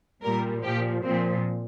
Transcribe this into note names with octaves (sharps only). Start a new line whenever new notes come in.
A#2 G3 A#4
A#2 F3 G4
A#2 F3 C4